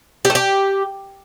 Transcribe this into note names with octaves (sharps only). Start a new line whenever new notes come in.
G4
A3
G4